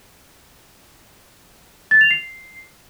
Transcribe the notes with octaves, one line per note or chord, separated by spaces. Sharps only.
A6
F7
C7